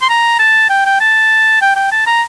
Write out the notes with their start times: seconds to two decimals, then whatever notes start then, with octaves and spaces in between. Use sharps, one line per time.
0.02 C6
0.09 A#5
0.39 A5
0.70 G5
0.86 G5
1.00 A5
1.61 G5
1.76 G5
1.92 A5
2.07 A#5